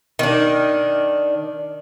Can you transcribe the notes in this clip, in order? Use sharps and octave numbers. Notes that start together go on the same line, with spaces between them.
D#3 D4